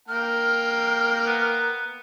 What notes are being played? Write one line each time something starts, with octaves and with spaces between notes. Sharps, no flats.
A#3 G5 A#5 F6
B3